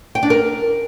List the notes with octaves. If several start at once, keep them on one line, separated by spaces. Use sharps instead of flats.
G5
D4
A#4